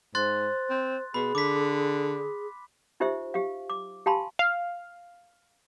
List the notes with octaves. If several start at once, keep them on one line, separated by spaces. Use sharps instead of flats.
G#2 C5 C6 F#6 A6
C4
B2 G#4 B5
D3 D6 B6
D#4 F4 G4 C5 E5
G4 F5
D6
G4 F5 G#5 A5 B5 C6
F5